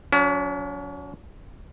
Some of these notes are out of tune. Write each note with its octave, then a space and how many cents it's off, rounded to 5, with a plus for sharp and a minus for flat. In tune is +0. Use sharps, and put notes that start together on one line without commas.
F#3 -25 C#4 +40